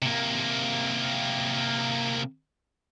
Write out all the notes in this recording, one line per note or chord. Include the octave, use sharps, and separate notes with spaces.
C3 A#3